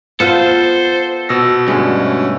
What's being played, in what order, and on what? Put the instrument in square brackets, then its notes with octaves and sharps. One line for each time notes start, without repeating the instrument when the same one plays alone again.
[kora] B3 F4 [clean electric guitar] A4 [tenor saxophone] C5
[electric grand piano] B2 E6 A#6
[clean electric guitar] D2 G2 [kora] G#3 [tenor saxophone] C#4